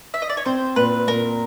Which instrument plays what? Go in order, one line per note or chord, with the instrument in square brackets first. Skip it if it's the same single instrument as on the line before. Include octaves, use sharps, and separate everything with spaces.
[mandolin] E5
D#5
D5
C#5
[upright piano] C4 [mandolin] C5
[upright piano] A#2 [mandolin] B4
[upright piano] A#2 [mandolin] A#4